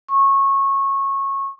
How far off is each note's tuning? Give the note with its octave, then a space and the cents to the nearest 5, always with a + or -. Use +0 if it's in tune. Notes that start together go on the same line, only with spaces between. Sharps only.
C#6 -20